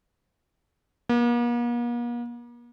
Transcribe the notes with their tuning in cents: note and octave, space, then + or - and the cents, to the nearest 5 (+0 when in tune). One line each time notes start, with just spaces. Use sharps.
A#3 +45